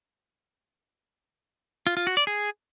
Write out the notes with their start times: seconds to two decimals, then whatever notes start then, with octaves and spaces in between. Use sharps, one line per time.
1.87 F4
1.97 F4
2.07 F#4
2.17 D5
2.27 G#4